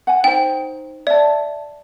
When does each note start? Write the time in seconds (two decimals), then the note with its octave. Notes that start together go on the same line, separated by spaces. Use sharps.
0.07 F#5 G#5
0.24 D#4 C5 G5
1.07 D5 E5 A5